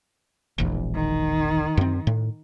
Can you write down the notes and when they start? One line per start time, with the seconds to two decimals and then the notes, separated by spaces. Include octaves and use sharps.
0.58 E1 A#1 E2
0.94 D#3
1.77 F#2 C4
2.07 A2